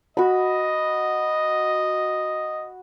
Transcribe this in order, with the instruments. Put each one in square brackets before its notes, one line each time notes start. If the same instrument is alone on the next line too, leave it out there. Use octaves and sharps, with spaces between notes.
[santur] F#4 B5 [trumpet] D#5